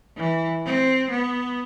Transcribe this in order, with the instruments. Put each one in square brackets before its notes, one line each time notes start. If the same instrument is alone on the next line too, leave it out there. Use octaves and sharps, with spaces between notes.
[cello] E3
C4
B3